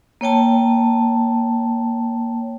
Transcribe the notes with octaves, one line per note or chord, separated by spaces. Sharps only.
A#3 C#5 G5 A5